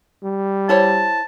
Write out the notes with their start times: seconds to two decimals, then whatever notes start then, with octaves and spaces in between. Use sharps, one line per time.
0.23 G3
0.69 E4 C5 C#5 A5